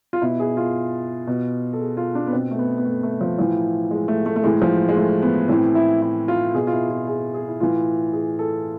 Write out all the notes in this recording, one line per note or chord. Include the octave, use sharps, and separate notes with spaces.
F4
B2 E4
G#4
F4
B2
A4
G#4
F4
D4
B3
B2 C4
A3
B3
B3
A3
A3
F3
A2 E3 F3
G#3
A3
A3
A3
A2 E3 G#3
F3
G#3
A3
B3
A2 E3 C4
E4
E4
F4
B2 G#4
F4
E4
F4
G#4
G#4
E4
A2 E3 F4
G#4
A4